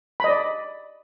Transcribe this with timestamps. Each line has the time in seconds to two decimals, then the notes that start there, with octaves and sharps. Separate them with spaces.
0.20 B5
0.24 D#5
0.28 D5